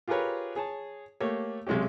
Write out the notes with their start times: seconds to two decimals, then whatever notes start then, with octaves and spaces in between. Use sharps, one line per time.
0.08 F4 G4 G#4 A#4 B4 C#5
0.56 G#4 C#5 A5
1.20 A3 A#3 G4 C#5
1.67 B1 C3 G#3 C#4 G4